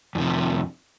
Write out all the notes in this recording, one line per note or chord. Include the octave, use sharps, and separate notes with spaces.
F2 C3 D#3